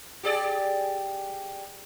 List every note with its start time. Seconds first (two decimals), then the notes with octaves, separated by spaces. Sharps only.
0.23 G4 G#4 D5